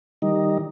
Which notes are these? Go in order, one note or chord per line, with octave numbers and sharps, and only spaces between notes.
D#3 G3 D#4